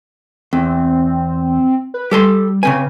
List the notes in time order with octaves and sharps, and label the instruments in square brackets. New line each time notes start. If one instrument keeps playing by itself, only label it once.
[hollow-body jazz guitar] E2 [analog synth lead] C4
[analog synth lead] B4
[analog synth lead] G3 [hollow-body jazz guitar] G4 A4 C6
[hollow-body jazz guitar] C#3 C4 G#5 [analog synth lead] B4